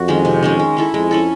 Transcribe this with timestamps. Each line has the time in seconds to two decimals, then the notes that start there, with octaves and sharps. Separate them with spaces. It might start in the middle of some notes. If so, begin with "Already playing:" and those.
Already playing: F2 F#4
0.08 D#3 G#3 C#4
0.25 C3
0.43 D#3 G#3 C#4
0.59 G#3
0.77 C#4 E4 A4
0.94 F2 G#3
1.11 C#4 E4 A4